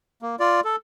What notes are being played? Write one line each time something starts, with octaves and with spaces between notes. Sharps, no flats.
A#3
F4 D5
A4